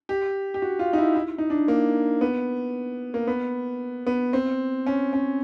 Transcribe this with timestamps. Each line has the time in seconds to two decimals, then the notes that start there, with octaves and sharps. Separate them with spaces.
0.09 G4
0.54 G4
0.62 F#4
0.79 F4
0.93 D#4
0.98 E4
1.15 E4
1.38 D#4
1.50 D4
1.68 A#3
2.21 B3
3.14 A#3
3.27 B3
4.07 B3
4.33 C4
4.86 C#4
5.13 C#4